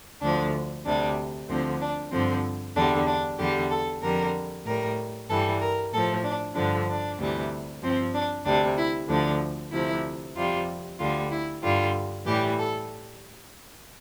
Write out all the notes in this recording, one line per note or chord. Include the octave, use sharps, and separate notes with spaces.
D2 D3 F3 D4
D2 C3 G3 D4
D2 D3 F3 C4
D4
G2 D3 F3 C4
E2 D3 G3 D4
D4
E2 D3 G3 G4
A4
F2 D3 G3 A#4
A2 G3 A#4
G2 E3 G3 A4
A#4
A2 F3 A4
D4
G2 D3 F3 D4
D4
D2 C3 E3 G3
G2 F3 C4
D4
D2 C3 G3 D4
E4
D2 D3 F3 D4
D2 C3 F3 E4
F2 C3 G3 F4
D2 D3 G3 F4
E4
G2 D3 G3 F4
A2 E3 G3 G4
A4